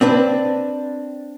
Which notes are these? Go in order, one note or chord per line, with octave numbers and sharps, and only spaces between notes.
C4 D4 B4